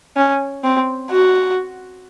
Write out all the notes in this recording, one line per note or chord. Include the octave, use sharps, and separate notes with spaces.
C#4
C4
F#4